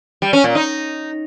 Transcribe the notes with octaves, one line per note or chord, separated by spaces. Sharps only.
G3
C#4
A#2
D#4